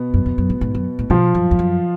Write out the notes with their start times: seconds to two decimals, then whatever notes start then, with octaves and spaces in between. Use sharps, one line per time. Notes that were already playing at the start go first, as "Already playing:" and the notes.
Already playing: B2 B3
0.14 F#2
0.26 F2
0.38 F#2
0.50 G#2
0.61 G#2
0.75 F#2
0.99 A2
1.10 B2 F3 F4
1.34 F#2
1.51 F2
1.59 F#2